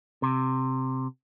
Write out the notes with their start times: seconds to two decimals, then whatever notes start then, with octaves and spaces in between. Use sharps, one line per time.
0.22 C3